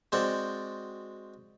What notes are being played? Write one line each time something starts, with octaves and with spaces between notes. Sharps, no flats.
G#3 C4 F#4 C5 D5